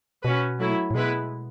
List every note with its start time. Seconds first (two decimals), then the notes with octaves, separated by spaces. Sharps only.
0.23 B2 C#4 F#4 B4
0.60 F#3 A3 E4
0.91 A2
0.95 B2 G#3 B3 E4 B4